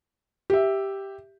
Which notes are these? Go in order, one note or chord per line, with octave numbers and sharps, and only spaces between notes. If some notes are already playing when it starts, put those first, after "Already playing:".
G4 E5